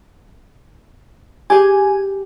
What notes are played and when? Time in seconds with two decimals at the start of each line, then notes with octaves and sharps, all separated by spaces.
1.50 G4 G#4 G#5